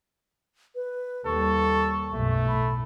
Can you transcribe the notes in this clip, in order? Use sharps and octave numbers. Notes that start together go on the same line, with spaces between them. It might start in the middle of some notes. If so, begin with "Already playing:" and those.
B4
D#2 G3 A4 C#6
B1 F#2 A3
A2 B5